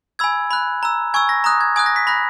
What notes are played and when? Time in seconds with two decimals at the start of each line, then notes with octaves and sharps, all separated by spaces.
0.19 G#5 B5 E6 G#6
0.51 B5 F#6
0.83 A#5 E6
1.14 G#5 C#6 E6 G#6
1.29 A#6
1.44 A#5 D#6 F#6
1.61 G#6
1.76 G#5 D#6 F#6 G#6
1.86 A#6
1.96 B6
2.07 B5 F#6 A#6